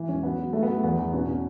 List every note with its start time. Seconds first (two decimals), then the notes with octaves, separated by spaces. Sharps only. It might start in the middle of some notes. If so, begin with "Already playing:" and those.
Already playing: E3
0.09 E1 C#4
0.23 F#3 B3
0.38 F#3
0.53 F#3 A3
0.63 B3
0.68 F#3 A3
0.83 E2 B3
0.98 E2
1.13 B2 C#4
1.27 B2